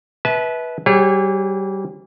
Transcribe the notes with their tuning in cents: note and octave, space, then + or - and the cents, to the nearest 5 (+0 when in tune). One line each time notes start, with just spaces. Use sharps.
B4 -10 E5 -30 A5 -35
G3 -25 G#4 -45 C#5 -35